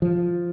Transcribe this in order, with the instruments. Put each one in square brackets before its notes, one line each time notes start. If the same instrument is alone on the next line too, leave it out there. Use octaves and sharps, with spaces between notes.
[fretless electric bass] F3